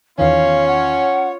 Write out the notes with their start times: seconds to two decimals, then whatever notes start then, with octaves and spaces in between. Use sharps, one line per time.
0.18 E2 D#3 C#4 F4 C#5 F5
0.67 F#5